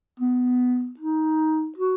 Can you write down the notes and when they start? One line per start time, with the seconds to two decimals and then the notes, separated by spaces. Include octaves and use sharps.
0.20 B3
1.00 D#4
1.78 F#4